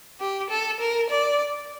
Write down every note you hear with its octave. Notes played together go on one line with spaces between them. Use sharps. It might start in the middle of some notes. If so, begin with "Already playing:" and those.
G4
A4
A#4
D5